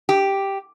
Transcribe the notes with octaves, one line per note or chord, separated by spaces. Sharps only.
G4